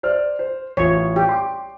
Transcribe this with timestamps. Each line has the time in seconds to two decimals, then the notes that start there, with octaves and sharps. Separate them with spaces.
0.03 C5 D5 F6
0.39 C5
0.77 A1 F4 C#5
1.16 G4
1.29 C6 D6